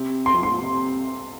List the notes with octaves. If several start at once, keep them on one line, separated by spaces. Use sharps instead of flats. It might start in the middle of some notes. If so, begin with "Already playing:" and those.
Already playing: C3
C6
F2
G#2 C6
A#2
C3